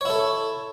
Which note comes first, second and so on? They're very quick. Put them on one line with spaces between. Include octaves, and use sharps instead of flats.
C#5 E4 A4